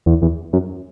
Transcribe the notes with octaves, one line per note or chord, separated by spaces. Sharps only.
E2
E2
F#2